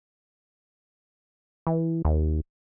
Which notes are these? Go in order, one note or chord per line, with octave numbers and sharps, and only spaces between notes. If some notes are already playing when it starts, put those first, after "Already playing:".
E3
D#2